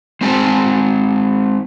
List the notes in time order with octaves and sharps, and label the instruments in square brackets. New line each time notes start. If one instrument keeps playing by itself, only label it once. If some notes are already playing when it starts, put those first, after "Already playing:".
[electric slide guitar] G#3 C4 G#5 A5